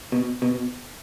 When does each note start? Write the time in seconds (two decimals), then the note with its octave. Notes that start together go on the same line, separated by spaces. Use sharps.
0.12 B2
0.42 B2